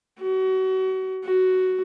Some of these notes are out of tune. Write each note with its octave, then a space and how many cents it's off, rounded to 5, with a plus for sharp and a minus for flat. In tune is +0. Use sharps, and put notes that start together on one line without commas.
F#4 +30
F#4 +10